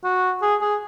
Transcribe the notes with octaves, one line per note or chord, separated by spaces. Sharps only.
F#4
G#4
G#4